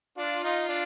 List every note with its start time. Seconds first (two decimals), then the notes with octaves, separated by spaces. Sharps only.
0.18 D4 F4
0.44 D#4
0.69 D4